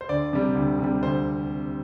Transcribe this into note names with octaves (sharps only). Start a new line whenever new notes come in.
C5
D2 D5
C3 G3
D2
C3 G3
D2 C5